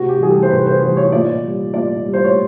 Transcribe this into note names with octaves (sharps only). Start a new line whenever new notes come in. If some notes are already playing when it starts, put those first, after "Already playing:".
Already playing: C3 F#4
G4
E3 G3 G#4
A4
C5
C3 B4
C5
E3 G3 C5
C#5
A#2 D5
G3
A#2 D5
G3
C5
C#5